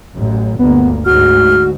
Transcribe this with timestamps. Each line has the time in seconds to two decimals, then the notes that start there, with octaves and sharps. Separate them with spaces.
0.16 A1 F#2
0.59 G1 D2 A#3 B3
1.06 D2 G#2 F#4 F6